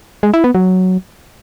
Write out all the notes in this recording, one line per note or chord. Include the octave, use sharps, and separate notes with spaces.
G#3
E4
B3
F#3